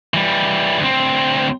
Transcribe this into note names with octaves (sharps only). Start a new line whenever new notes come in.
E3 G3
D2 C4